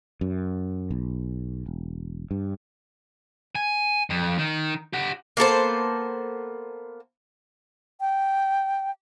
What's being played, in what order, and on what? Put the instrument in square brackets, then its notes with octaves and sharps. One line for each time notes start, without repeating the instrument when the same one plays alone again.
[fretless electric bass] F#2
B1
E1
G2
[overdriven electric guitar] G#5
F2
D#3
G4 F#5
[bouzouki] A#3 B3 A4 C5
[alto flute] G5